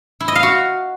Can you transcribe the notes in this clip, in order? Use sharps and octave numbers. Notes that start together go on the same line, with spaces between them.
E4
D#5
F5
F#4